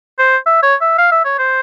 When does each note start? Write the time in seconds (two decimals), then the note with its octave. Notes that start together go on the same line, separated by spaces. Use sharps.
0.19 C5
0.46 E5
0.63 C#5
0.81 E5
0.98 F5
1.11 E5
1.25 C#5
1.38 C5